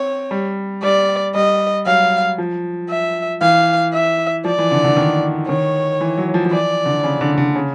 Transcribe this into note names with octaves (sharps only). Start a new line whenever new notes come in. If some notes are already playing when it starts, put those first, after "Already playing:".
Already playing: C4 C#5
G3
G3 D5
G3 D#5
F#3 F5
F3
E5
E3 F5
E5
F3 D5
E3
D3
D3
D#3
D#3 C#5
E3
F#3
F3
F3
E3 D5
D3
C#3
D3
D3
C#3